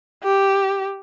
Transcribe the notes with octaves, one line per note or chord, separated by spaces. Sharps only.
G4